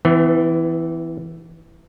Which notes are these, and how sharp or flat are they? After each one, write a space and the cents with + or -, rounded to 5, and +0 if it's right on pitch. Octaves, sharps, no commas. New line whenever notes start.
E3 +0 B3 +40